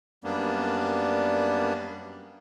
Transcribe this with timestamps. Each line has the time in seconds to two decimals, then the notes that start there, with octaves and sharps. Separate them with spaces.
0.24 F#2 G3 A#3 B3 D4